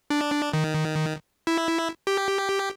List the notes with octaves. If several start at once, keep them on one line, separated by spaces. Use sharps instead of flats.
D4
D#3
E4
G4